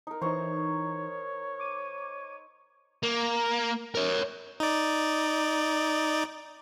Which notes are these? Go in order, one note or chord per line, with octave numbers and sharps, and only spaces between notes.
D#4 A#4
E3 D#4 C5 C#5 A#5 C#6
D6 D#7
A#3
A#4 C#5
D#4 D5